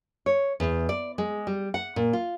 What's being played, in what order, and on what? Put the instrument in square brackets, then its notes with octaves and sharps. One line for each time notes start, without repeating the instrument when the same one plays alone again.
[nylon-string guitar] C#5
E2
D5
G#3
G3
F#5
A#2
F4